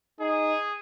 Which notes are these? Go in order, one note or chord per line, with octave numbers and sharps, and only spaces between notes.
D#4 G#4